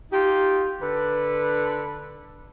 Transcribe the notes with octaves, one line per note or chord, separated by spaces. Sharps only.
D#4 F4 G4
D3 A4 B4